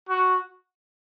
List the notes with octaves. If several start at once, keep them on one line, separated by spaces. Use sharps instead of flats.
F#4